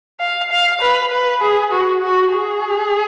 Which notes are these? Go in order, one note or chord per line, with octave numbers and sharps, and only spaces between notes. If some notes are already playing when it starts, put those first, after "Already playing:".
F5
F5
B4
B4
G#4
F#4
F#4
G#4